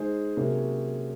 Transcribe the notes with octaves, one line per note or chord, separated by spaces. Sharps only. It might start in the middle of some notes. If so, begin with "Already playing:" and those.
Already playing: G#3 D#4 G#4 C5
C3 F#3 A#3 C#4 G#4